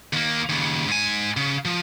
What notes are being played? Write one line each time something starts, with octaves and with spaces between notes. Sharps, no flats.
D#2 A#3
D#2 C#3
G#2 G#5
C#3
F3